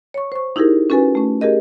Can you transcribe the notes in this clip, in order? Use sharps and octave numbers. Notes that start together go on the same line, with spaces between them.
C#5 C#6
C5 C#6
D#4 E4 G4 G#4 A#4
C#4 F#4 A4 B4 G#5
A3 C#4
G4 G#4 A#4 D#5